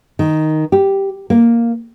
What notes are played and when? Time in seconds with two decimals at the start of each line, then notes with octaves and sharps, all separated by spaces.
0.19 D#3
0.72 G4
1.30 A#3